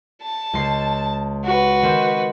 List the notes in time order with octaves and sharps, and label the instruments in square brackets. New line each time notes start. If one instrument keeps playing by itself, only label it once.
[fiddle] A5
[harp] C#2 C7
[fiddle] F#4 B4
[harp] D#3 C4